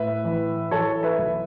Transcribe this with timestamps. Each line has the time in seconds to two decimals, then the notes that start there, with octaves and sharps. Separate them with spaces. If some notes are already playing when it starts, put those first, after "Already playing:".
Already playing: A2 B4 E5
0.24 E3
0.71 E3 A4 C#5
1.03 B4 E5
1.19 B1